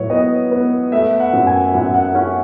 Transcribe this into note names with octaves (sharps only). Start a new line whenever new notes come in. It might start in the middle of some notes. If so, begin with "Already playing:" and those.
Already playing: A2 F#3 B4 C#5
B3 D#5
B3
A3 E5
F#5
F#2
G#5
F#2 F#5
F#5
C#4 F#5